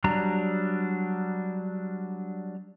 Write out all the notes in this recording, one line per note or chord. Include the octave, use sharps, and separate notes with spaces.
F#3 G3 D4 A#5